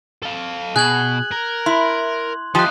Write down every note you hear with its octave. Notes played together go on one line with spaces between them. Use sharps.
A4 F5
B2 G#4 F#6 G#6 F#7
A#4
E4 C6
F3 D#4 F4 G4 D#6 F#6